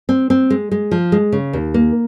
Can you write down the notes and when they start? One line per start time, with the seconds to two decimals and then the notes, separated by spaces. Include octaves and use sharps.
0.09 C4
0.30 C4
0.50 G#3
0.71 G#3
0.91 F3
1.12 G#3
1.32 C#3
1.53 D#2
1.74 A#3